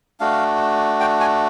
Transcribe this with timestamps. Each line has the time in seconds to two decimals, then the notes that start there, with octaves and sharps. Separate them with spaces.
0.20 A3 D4 F#4 F5
1.00 G5
1.20 G#5